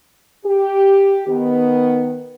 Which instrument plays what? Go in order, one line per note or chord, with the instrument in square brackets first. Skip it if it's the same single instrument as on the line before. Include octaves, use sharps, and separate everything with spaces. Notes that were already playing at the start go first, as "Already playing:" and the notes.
[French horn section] G4
D#3 B3